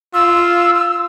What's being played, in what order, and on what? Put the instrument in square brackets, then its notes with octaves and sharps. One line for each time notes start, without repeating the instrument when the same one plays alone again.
[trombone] F4 [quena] E6